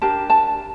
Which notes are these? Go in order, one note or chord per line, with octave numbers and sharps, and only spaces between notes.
D4 G4 A#4 A5
A5